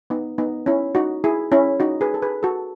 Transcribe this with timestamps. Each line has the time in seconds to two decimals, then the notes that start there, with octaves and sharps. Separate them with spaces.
0.10 B3 D#4
0.38 B3 D#4
0.66 C#4 E4
0.95 D#4 F#4
1.24 E4 G#4
1.52 C#4 E4
1.80 D#4 F#4
2.01 G#4 B4
2.14 A4
2.22 G#4 B4
2.43 F#4 A4